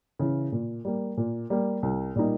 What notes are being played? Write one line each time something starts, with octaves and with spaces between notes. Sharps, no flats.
C#3 E3
A#2
G3 A#3
A#2
G3 A#3
C2
A#2 G3 A#3 D#4